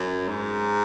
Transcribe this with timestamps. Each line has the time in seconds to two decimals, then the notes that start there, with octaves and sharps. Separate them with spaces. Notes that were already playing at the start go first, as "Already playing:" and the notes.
Already playing: F#2
0.29 G#2